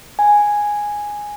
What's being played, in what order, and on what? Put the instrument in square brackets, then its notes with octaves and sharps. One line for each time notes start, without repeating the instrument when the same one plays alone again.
[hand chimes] G#5